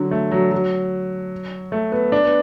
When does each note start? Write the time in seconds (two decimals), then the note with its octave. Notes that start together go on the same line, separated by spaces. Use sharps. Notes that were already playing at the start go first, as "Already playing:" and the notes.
Already playing: D3 F#3
0.11 A3
0.31 F#3
0.51 F#3
1.72 A3
1.92 B3
2.12 D4
2.25 B3